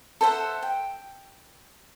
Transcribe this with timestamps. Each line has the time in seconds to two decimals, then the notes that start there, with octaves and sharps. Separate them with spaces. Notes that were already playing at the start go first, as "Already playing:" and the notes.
0.21 A4 C5 E5 F#5
0.62 G5